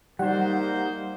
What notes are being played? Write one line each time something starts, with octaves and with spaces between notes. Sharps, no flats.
G3 A#3 D#4 C5 F#5